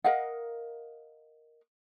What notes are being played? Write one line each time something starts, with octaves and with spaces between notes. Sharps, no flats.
A#4 D#5 F5 F#5